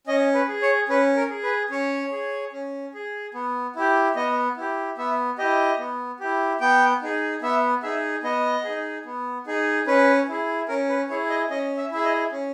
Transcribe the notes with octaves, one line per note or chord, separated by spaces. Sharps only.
C#4 D#5
B4
G#4
C#5
C#4 B4
A#4
G#4
B4
C#4 C#5
G#4
C#4
G#4
B3
E4 G4
B3 D#5
E4 G4
B3 E5
E4 G4 D#5
B3
E4 G4
B3 G5
D#4 G#4
B3 E5
D#4 G#4 E5
B3 D#5
D#4 G#4
B3
D#4 G#4
C#4 B4
E4 G#4
C#4 A#4
B4
E4 G#4 C#5
D#5
C#4 D#5
E5
E4 G#4 E5
D#5
C#4